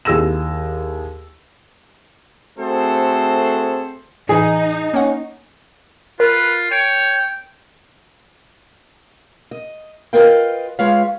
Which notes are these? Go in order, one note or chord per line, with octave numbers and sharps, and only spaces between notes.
D#2 E4 G#4 E6 A#6 E7
A3 C4 F#4 G#4 A4 C5
A2 E3 D#4 G#4
A#3 C#4 F#5
F4 A#4 B4
C#5 G5 D7
D#5
F4 A#4 B4 D#5 F5 G5
G#3 F4 B4 C#5 F5